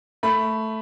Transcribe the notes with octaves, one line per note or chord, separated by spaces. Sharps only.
A3 B5